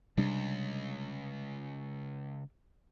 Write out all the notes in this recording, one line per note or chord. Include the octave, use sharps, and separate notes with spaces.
C#2 C3 G3 D4